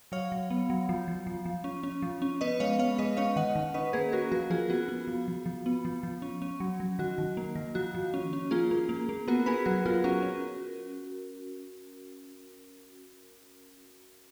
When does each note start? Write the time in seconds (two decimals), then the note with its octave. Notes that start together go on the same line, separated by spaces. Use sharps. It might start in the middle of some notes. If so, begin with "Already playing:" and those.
0.12 F#3 C#5 F5
0.32 F#3
0.50 B3
0.70 F#3
0.89 F3
1.08 F3
1.27 F3
1.46 F3
1.64 C#4
1.83 C#4
2.02 F3
2.22 C#4
2.41 B3 B4 D#5
2.60 G#3 C#5 F5
2.79 B3 C#5 F5
2.98 G#3 B4 D#5
3.17 C#4 C#5 F5
3.36 D#3 D#5 F#5
3.56 D#3
3.74 C#4 B4 D#5
3.93 A#3 G#4 B4
4.12 C#4 F#4 A#4
4.31 F3 F#4 A#4
4.50 F3 F4 G#4
4.70 B3 F#4
4.88 B3
5.08 F3
5.28 F3
5.46 F3
5.66 B3
5.85 F3
6.03 F3
6.22 C#4
6.42 C#4
6.60 F#3
6.80 F#3
6.99 D#3 F#4
7.18 D#3
7.37 A#3
7.55 D#3
7.75 F3 F#4
7.95 F3
8.14 C#4
8.33 C#4
8.51 A#3 F4 G#4
8.71 A#3
8.89 A#3
9.09 A#3
9.28 B3 F#4 A#4
9.46 B3 G#4 B4
9.65 F#3 F#4 A#4
9.86 F#3 F4 G#4
10.04 C#4 F#4 A#4
10.23 C#4